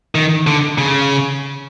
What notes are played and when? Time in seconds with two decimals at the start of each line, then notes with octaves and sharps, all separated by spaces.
0.15 D#3
0.47 D3
0.78 C#3